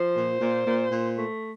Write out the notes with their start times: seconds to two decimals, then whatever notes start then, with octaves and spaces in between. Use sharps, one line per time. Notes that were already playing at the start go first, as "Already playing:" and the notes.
Already playing: F3 C5
0.17 A#2
0.41 A#2
0.67 A#2
0.92 A#2
1.17 A3